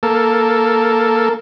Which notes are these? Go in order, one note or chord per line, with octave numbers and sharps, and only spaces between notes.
A#3 A4